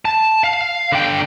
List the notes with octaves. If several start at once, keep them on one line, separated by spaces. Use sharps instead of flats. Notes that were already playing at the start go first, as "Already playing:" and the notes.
A5
F5
D3 G5